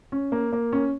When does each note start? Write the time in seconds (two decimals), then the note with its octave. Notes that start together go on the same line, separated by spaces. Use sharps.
0.12 C#4
0.32 A#3
0.53 A#3
0.73 C#4